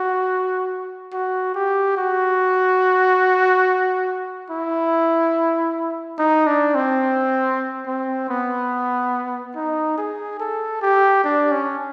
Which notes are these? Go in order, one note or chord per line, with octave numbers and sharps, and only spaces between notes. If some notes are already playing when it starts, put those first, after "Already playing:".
Already playing: F#4
F#4
G4
F#4
E4
D#4
D4
C4
C4
B3
D#4
G#4
A4
G4
D4
C#4